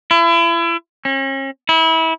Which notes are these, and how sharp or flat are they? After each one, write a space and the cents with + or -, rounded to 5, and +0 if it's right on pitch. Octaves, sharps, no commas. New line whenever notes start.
E4 +35
C#4 -40
E4 -25